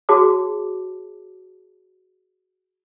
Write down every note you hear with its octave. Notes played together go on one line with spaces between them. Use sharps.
F#4 G#4 C#5 A5 D6